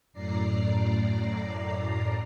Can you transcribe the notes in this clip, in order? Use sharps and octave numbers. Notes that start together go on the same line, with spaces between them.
F#2 A2 D5 A#5 C7